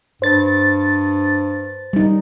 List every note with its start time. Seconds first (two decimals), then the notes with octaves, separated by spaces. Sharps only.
0.22 G2 C5 A6
1.93 G3 D#4